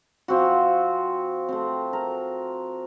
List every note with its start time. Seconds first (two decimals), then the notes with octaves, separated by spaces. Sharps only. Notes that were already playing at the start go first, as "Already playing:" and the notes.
0.28 F3 C4 F#4
1.49 A3 C4
1.93 A#4